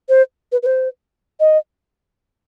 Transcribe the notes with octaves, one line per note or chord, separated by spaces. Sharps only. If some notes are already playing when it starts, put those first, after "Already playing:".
C5
B4
B4
C5
D#5